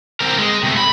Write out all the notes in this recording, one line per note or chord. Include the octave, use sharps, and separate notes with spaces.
C4 A#4
G#3
C3 A3
B5